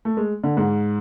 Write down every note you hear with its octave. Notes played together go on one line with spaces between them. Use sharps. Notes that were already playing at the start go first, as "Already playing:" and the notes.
A3
G#3
D3
G#2